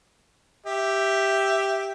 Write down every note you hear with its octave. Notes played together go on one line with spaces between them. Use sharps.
G4 E5